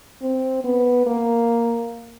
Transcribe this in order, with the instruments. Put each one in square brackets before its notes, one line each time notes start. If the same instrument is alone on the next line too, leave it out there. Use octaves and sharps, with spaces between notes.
[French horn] C4
B3
A#3